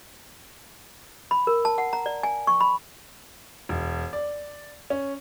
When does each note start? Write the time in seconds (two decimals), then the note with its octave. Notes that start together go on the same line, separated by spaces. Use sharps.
1.31 B5
1.47 A#4
1.65 A5
1.78 F#5
1.93 A#5
2.06 D5
2.23 G#5
2.47 C#6
2.61 B5
3.69 E1
4.13 D5
4.90 C#4